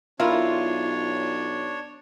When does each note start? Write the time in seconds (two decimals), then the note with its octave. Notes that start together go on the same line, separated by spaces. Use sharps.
0.20 B1 D4 E4 F4 A#4 C#5